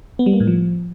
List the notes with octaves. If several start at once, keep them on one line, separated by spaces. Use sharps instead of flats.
B3
G3
A#3
A2
F3